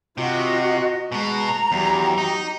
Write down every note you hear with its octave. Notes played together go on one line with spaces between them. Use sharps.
C3 F4 F#4 D#5
B2 G#3 F#4 A#5
E2 F#3 G4
D#4